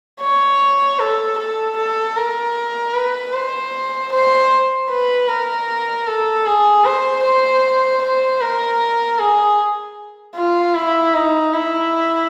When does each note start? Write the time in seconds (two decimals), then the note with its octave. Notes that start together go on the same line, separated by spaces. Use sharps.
0.21 C#5
0.99 A4
1.38 A4
1.77 A4
2.16 A#4
2.94 B4
3.33 C5
4.12 C5
4.90 B4
5.28 A#4
6.07 A4
6.46 G#4
6.85 C5
7.24 C5
8.02 C5
8.41 A#4
9.19 G#4
10.36 F4
10.75 E4
11.14 D#4
11.53 E4